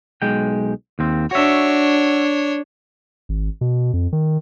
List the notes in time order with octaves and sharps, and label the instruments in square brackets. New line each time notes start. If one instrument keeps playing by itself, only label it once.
[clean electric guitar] B1 G#3 G5
D#2 C4
[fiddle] D4 C#5 [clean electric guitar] F#4 E5
[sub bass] G#1
B2
F2
D#3